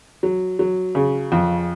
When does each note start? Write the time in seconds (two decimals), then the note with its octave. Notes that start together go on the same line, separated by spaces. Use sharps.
0.23 F#3
0.59 F#3
0.95 C#3
1.32 F2